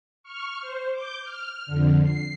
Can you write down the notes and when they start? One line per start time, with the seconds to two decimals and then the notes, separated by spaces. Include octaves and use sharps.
0.23 C#6 F6
0.60 C5
0.92 D6 G6
1.23 F6
1.66 F2 D3
2.03 C7